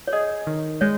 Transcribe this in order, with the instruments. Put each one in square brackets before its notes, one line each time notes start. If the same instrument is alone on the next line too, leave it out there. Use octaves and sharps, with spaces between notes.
[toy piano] C#5
[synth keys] G#4 [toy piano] D#5
[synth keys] D#3
[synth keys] G#3 [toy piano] C#5